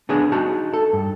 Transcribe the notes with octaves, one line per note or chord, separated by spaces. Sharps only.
B3 C#4 D4 G#4
D#4 F#4 A5
A4
G2